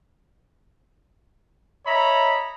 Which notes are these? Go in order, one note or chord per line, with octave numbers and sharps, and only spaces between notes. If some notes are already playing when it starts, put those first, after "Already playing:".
C#5 D#5 E5 A#5 B5